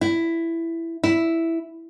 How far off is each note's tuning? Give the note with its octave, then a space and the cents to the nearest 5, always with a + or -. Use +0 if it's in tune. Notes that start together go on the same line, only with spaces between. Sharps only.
E4 +10
E4 +0